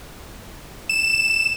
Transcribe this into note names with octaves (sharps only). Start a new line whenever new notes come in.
E7